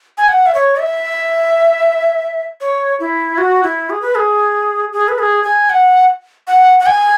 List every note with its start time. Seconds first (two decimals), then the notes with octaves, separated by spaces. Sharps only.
0.18 G#5
0.28 F#5
0.46 E5
0.55 C#5
0.80 E5
2.61 C#5
3.00 E4
3.38 F#4
3.63 E4
3.90 G#4
4.02 B4
4.15 G#4
4.93 G#4
5.08 B4
5.19 G#4
5.44 G#5
5.70 F#5
6.48 F#5
6.80 F#5
6.86 G#5